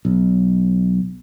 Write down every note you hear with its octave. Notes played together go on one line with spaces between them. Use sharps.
B1